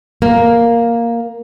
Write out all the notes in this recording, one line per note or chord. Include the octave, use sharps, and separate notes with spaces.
A#3